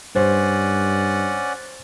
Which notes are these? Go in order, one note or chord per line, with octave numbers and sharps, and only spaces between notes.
G2 C#4 C5 D5 F#5